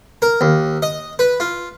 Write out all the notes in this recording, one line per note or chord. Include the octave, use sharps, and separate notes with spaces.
A#4
D#2
D#5
B4
F4